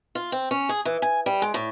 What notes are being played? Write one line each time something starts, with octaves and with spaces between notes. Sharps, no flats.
F4
C4
C#4
G#4
E3
G#5
G3
G#3
A2